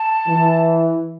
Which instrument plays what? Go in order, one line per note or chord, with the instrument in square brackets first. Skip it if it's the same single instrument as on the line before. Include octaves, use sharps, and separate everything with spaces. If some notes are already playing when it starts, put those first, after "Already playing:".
Already playing: [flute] A5
[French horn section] E3